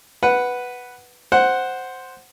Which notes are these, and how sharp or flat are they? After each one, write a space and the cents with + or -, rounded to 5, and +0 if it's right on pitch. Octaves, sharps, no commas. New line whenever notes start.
B4 +0 F#5 +0
C5 +0 F#5 +0